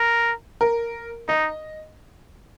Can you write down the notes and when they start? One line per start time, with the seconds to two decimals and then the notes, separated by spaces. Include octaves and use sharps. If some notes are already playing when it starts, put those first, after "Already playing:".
Already playing: A#4
0.61 A#4
1.29 D#4 D#5